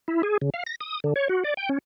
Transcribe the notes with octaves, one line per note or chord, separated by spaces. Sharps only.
E4
G#4
C#3
F5
A#6
D#6
D3
C#5
F#4
D5
G5
C#4